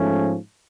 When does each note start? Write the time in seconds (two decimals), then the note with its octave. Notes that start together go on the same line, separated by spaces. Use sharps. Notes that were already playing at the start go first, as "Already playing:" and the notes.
Already playing: G#2 F3 A3 C#4